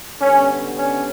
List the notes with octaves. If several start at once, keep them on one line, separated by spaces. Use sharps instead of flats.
D3 G3 B3 C#4
C#4